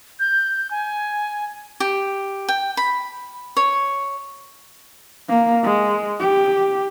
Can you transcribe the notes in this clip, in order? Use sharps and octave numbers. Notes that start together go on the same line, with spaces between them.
G6
G#5
G4
G5
B5
C#5
A#3
G#3
G4